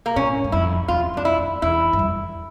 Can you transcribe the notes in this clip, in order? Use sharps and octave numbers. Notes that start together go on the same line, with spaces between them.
A#3
A2 C#4
G2
F2 E4
E2 F4
F2 D4
E4
F2
E2 E4
G2
F2